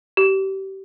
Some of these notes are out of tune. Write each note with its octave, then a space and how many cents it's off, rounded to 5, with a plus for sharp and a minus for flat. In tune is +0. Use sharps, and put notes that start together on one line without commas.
G4 -25